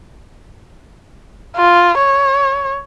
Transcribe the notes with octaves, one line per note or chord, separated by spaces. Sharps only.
F4
C#5